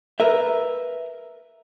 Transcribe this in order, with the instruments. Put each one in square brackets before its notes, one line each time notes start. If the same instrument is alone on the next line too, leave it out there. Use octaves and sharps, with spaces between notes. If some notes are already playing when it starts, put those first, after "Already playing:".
[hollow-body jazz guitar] A#4 B4 E5